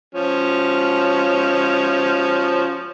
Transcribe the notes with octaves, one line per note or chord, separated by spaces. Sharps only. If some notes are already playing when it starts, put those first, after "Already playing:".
F3 C#4